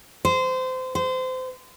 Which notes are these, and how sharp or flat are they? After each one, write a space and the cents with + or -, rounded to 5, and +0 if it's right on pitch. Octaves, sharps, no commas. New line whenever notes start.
C5 -25
C5 -30